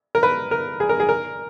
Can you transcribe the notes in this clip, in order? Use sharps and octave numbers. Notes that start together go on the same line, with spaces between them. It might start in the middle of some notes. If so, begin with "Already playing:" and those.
A#4
B4
A#4
G#4
A#4
G#4
A#4